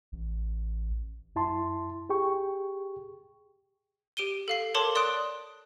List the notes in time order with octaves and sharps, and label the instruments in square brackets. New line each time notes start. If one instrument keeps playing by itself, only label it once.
[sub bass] A1
[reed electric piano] F#2 E4 A5 C6
G4 G#4 G5 C#6
[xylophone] G4 D7 D#7 G7
A4 F5 C7
A4 A#4 C#5 A5 C6 D6
D5 C6 D#6 F#6 D7